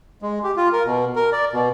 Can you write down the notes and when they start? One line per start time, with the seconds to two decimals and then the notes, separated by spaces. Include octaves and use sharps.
0.22 G#3
0.44 G4
0.56 F4
0.72 A#4
0.85 B2
1.16 A#4
1.32 D5
1.53 B2